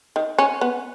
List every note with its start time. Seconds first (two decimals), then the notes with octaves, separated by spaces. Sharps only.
0.16 D#3
0.39 C#4
0.61 B3